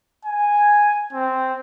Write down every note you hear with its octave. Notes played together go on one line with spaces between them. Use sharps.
G#5
C4